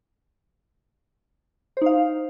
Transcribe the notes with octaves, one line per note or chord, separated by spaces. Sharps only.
D#4 C5 F5